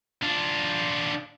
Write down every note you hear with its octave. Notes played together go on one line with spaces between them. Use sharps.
D4 F4